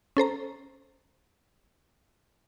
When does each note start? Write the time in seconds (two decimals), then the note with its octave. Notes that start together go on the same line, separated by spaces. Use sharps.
0.17 C#4 A4 C5 A#5